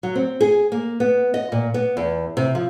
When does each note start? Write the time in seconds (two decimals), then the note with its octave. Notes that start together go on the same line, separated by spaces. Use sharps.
0.03 F#3
0.15 C4
0.41 G#4
0.72 A#3
1.00 B3
1.34 D#5
1.52 A#2
1.74 B3
1.97 E2
2.37 C3
2.55 F3